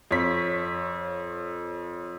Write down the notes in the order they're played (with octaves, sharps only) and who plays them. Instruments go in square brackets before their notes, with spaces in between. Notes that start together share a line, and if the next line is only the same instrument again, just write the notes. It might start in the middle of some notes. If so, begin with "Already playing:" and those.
[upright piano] F2 C#5 B6